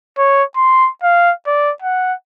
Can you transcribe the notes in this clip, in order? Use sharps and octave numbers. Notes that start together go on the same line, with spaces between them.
C#5
C6
F5
D5
F#5